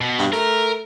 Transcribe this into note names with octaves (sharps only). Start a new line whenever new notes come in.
B2
G2
A3 A#4